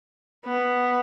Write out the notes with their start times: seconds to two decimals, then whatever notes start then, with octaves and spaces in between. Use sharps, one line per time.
0.45 B3